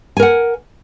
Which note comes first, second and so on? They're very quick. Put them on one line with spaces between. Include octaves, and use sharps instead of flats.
G#5 A#4 F#5